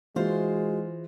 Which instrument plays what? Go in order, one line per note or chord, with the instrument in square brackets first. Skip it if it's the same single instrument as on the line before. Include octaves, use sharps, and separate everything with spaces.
[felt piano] E3 [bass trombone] G#3 [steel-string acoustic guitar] F4 C5 [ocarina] F#4